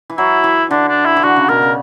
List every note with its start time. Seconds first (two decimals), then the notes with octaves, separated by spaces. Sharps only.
0.10 E3
0.17 F#3 E4
0.44 E3
0.71 D3 D4
0.88 D4
1.06 E4
1.16 E3
1.23 D3 F#4
1.36 C#3
1.49 B2 A#4
1.62 C#3